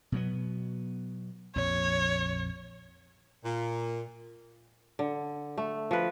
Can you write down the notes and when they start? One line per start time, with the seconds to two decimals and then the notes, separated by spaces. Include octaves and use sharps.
0.12 B2 F#3 B3
1.56 A#1 F2 C#5
3.44 A#2
4.99 D3
5.58 A3
5.91 F3 B4